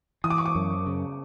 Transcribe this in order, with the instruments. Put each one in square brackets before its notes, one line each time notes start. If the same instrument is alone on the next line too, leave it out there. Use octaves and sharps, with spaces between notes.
[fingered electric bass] E3 [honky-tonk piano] D#6
[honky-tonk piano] D6
C#6
D6
[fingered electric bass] F#2
C#3